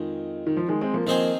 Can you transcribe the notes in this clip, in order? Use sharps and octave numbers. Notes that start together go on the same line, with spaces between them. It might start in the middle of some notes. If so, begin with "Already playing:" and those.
Already playing: F2 D#3 G#3
D#3
F3
D#3 G#3
G#3 C4
F3 A#3
D#3 F3 A#3 C4 G#4 C5